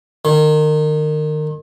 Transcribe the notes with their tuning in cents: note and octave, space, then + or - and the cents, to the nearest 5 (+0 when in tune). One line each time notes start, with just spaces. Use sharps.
D#3 -30